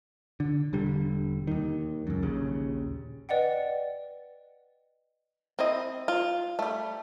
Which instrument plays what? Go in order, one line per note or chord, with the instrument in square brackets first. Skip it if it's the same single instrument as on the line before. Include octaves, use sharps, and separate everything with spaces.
[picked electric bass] D3
E1 D3 G3
D#2 D#3
C#2 F#2
A#1 D#2 C#3
[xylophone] B4 D5 D#5 F#5 G5
[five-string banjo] C4 E4 D#5
F4
G3 A3